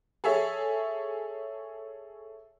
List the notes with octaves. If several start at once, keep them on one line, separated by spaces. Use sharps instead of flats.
G#4 A4 C#5 E5